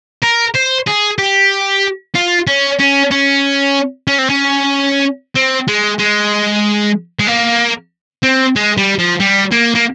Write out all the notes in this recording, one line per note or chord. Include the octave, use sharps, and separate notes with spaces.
A#4
C5
G#4
G4
F4
C#4
C#4
C#4
C#4
C4
C#4
C4
G#3
G#3
G#3
A#3
C4
G#3
G3
F3
G3
A#3
A#3